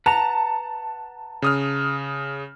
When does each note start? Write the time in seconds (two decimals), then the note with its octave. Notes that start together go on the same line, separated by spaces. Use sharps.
0.06 B4 F#5 A5 A#5
1.42 C#3 D#6 F6